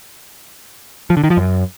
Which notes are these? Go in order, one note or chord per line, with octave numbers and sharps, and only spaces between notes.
F3
D3
D#3
F3
F#2